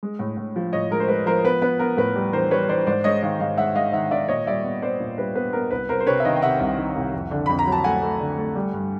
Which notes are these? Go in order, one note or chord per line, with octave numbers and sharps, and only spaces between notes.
G#3
A2
A2
F3
A2 C#5 D#5
G#3 A#4
C5
G#3 B4
F3 A#4 C5
B3 B4
B3 B4
B3 A#4
A2 B4
G3
E3 A#4 C5
G3 B4 C#5
E3 C5 D5
G#2 C5 D5
G#3 C#5 D#5
D#3 D#5 F5
G#2 D#5 F5
G#3 E5 F#5
G#3 D#5 F5
D#3 E5 F#5
D#3 D5 E5
A#2 C#5 D#5
G3 D5 E5
B3
B3 C5 D5
A#2
G3 B4
B3 B4
B3 A#4
C2 B4
C2 A#4 C5
C5
C3 B4 C#5
E5
D#3 D#5 F5
G5
C3 E5 F#5
C2
D#3
C2
F2
D3
F2 B5
A#5
F#3
A5
A3 F#5 G#5
A3
D3
A3
G3
G2